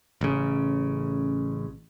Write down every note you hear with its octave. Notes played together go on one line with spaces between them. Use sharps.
A1 C#3